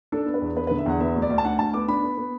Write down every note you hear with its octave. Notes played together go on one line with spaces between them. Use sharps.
D4 A4
B3
B4
E2
B3 B4
B4
D3
E5
E2 F#5
B3 E5
D2
D5
D2
A5
D4 F#5
D2 A5
B3 D6
D4 B5
B3
B3